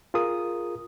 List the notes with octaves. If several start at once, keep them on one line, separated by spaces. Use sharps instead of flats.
F4 G#4 A#4 D#6